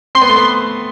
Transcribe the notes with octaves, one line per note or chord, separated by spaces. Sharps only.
C4 C6
B3
A3
B3